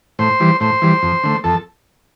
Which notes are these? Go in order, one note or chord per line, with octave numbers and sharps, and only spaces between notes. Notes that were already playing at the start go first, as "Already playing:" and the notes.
A2 C5
E3 G3
A2 C5
E3 G3
F2
D3 A3
F2 A4